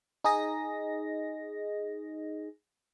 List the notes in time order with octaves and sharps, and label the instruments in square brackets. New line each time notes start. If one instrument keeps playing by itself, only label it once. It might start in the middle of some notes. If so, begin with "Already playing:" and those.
[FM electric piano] D#4 G#4 D#5 A#6